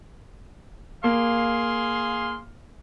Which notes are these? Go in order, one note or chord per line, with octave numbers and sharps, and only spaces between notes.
A#3 G#4 F5 C6